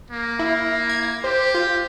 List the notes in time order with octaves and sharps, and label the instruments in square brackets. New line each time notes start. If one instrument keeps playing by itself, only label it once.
[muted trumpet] A#3
[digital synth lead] E4
G#6
[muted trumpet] G4 [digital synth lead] C5
[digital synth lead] F4